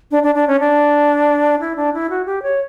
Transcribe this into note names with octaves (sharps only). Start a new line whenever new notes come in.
D4
D4
D4
C#4
D4
E4
D4
E4
F#4
G4
C#5